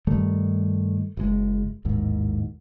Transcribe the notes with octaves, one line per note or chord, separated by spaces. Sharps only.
G2 D#3 G3 A3
F#1 A2 G#3
A1 D#2 G#2